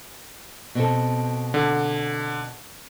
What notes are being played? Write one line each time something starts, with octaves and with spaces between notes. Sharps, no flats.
B2 C4 A4
D3